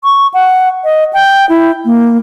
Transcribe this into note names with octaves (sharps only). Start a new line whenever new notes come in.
C#6
F#5
D#5
G5
E4
A#3